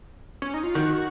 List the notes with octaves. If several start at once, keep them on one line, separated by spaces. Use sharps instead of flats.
C#4
D#4
F4
D#3 F#4